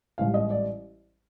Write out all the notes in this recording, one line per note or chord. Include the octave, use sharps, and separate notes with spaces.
A1 G#2 E3 G3 F5
D#5
D5